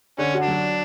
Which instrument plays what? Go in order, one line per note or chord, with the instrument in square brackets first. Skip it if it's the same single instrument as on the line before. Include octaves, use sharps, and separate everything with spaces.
[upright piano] D3 [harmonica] C#4
[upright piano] F#4
[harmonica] D4
[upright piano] F#3